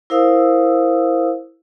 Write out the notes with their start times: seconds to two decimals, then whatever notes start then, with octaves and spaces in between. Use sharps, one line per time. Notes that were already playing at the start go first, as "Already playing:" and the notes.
0.10 E4 A#4 C5 F5 D#6 E6